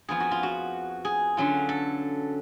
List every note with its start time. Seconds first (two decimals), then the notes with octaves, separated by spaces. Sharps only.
0.08 F2 F3 B3 F4 G#4
0.20 F#4
0.31 F4
0.43 F#4
1.05 G#4
1.37 D3 F#3 C#4 F4
1.69 A4